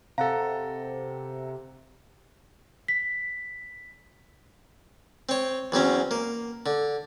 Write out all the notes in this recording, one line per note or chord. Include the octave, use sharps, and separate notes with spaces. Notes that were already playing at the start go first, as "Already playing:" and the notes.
C3 A4 F5 F#5 A#5
B6
C4 C#5
E2 F#3 C4 C#4
A#3
D3